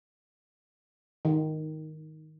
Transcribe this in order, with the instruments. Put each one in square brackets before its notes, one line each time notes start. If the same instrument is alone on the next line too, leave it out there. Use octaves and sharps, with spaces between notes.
[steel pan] D#3